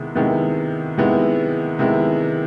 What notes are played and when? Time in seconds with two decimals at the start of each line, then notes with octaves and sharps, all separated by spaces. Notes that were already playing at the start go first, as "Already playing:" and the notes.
Already playing: C3 D#3 G#3 B3 E4
0.15 C3 D#3 G#3 B3 E4
0.98 C3 D#3 G#3 B3 E4
1.79 C3 D#3 G#3 B3 E4